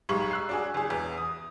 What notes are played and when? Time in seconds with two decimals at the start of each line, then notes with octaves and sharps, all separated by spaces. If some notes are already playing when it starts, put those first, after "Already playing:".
0.09 B1 G#2 G3 G#3 C#6 F#7
0.31 E6 F#6 C7
0.49 D4 F#4 G#4
0.74 F#1 G#4
0.90 E2
1.17 D#6